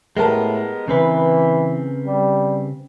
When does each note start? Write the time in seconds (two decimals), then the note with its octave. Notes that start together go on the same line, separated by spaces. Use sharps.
0.17 A2 G#3 B3 G4 A#4 A5
0.88 C#3 E3 C4 B4
2.06 G3